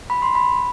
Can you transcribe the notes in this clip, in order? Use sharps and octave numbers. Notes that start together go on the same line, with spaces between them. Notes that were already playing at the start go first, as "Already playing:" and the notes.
B5
C6
B5